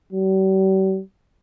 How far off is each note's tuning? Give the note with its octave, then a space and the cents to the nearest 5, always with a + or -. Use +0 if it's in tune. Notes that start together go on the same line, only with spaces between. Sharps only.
G3 -45